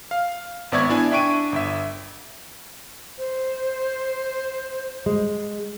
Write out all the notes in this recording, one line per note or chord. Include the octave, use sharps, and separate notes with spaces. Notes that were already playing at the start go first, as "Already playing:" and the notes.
F5
G#1 B3 D5 E5 C#6 G#6
B3 D4 E4 G#5
D4 E5 G5 C#6 D7 D#7
G1 E5
C5
G#3